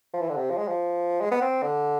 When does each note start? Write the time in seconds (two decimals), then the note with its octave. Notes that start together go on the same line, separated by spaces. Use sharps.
0.14 F3
0.21 E3
0.29 D3
0.37 C3
0.50 F3
0.57 G#3
0.68 F3
1.21 G#3
1.31 B3
1.41 C4
1.63 D3